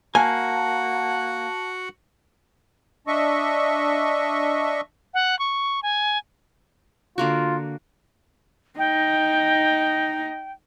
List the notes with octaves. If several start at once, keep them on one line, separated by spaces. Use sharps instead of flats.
A#3 F#4 F#5 G#5 A5
D4 D#5 E5 C#6
F#5
C#6
G#5
D3 A#3 F4 F#4
D#4 D#5 G5